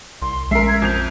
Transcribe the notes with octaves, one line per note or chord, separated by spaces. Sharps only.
C2 C6
A#1 G#3 C#4 A#4 E5 C7
G#6
F2 G6 F7